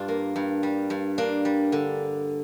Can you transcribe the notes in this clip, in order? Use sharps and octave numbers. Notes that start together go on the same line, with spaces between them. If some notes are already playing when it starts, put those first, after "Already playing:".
Already playing: G2 D4 F4
A#3
G2
G3
G2
A#3 D4
G3
D3